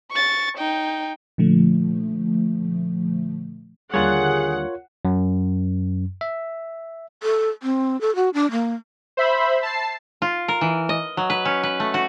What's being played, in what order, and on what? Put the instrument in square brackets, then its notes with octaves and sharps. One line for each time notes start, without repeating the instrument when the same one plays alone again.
[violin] C#6 A6
D#4 G5
[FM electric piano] A#2 D3 F3 A3
[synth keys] D#2 D3 G3 [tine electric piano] F4 A#4 C#5 [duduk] G#4 [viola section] F#5
[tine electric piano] F#2
E5
[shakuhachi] A4
C4
A4
F#4
D4
A#3
[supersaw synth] C5 E5 B5
A5 C7
[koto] F4
A#4
E3
D#5
F#3
B4
C#4
B4
A3
F#4